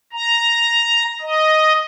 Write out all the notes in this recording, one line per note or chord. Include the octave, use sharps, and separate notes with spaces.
A#5
D#5